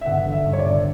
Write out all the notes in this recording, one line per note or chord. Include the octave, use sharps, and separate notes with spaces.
E5
G1 F#5
D3
E5
G2
C#5
D5
G1